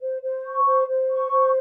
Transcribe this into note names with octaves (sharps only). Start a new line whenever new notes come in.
C5
C5
C#6
C5
C5
C#6
C5